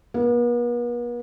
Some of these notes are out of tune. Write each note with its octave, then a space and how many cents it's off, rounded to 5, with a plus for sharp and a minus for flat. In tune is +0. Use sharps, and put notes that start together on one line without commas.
B3 -45